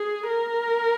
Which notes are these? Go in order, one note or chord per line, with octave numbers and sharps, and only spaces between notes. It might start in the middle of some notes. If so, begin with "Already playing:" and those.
Already playing: G#4
A#4